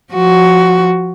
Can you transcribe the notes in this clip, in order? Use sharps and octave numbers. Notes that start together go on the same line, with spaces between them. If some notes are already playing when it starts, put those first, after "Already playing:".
F3 F#4